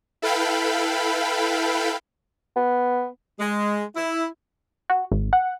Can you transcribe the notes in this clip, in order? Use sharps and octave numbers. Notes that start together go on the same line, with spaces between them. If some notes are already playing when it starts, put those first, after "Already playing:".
E4 A4 B4 F5 G5 B5
B3
G#3
E4
F#4
G#1
F#5